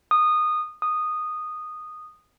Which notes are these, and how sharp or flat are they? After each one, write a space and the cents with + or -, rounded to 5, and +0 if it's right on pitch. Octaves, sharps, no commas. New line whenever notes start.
D#6 -20
D#6 -10